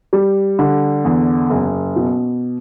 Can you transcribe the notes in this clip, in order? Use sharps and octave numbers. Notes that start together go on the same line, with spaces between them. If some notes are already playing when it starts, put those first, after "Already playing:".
G3
D3
E2
F#1
B2